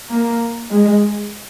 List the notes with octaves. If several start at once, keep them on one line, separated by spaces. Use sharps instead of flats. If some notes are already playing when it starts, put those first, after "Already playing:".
A#3
G#3